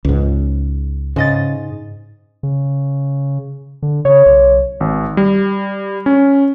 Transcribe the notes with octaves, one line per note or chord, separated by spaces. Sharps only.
C#2 G#2
G#2 C#3 D#5 A6
C#3
D3
C#3 C#5
B1
G#1
G3
C#4